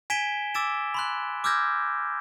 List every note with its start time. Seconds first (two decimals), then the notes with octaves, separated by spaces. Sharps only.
0.10 G#5 G#6 B6 D7 E7 G7
0.55 D6 E6 A6 D7 E7
0.94 B5 C6 F#6
1.44 D6 E6 F6 G6 G#6 A#6